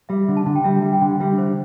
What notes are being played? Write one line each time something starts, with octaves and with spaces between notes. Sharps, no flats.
G3 E5
D3
A5
D3
G5
G3 E5
G3
G5
D3
G3 E5
D3 C5